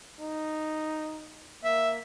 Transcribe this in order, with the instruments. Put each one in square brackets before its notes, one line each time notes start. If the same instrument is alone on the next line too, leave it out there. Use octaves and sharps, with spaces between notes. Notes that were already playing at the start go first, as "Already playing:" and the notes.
[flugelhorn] D#4
[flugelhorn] A#3 [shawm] E5